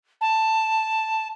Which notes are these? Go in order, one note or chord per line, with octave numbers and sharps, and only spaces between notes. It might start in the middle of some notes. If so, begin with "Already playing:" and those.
A5